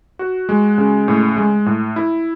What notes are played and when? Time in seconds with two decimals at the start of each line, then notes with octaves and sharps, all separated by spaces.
0.19 F#4
0.49 G#3
0.78 C#3
1.08 A2
1.36 G#3
1.66 A2
1.96 E4